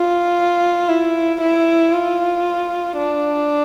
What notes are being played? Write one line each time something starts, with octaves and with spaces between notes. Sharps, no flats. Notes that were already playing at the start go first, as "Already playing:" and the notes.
Already playing: F4
E4
E4
F4
D4